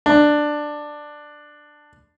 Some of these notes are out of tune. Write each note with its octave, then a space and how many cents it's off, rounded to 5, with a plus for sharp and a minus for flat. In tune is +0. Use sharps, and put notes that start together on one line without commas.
D4 +10